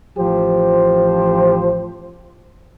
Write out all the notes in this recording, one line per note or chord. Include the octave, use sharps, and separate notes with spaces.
A1 F3 G4 C5